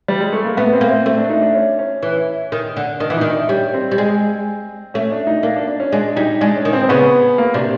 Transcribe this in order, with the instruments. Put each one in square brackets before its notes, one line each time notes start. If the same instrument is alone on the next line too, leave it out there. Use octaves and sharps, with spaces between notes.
[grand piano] G3
G#3
A3
A#3
[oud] A3 [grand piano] B3
[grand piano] C4
[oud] A#3
[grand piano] C4
[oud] A3 [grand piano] C4
[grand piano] D4
D#4
D4
C#4
C#4
[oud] E3
D#3
D3
[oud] D#3 [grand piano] D4
[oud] E3
[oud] D#3 [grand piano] D#4
[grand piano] D4
[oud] G3 [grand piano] C#4
[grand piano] C4
[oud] G3
G#3
[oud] A3 [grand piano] C#4
[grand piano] D4
D#4
[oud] A#3 [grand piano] D4
[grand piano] D4
D4
C#4
[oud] G#3 [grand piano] D4
[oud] G3 [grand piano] D#4
[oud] G#3 [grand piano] D4
[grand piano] C#4
[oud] D#3
[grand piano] C4
C4
[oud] C#3 [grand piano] B3
[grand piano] A#3
[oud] C3 [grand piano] D4